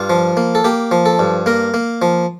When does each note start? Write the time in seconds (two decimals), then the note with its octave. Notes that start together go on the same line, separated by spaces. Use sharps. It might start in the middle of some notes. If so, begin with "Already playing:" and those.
Already playing: G2 F4
0.10 F3
0.37 A#3
0.55 A4
0.64 A#3 G4
0.91 F3
1.06 A4
1.19 G2
1.46 A#3 A#4
1.74 A#3
2.02 F3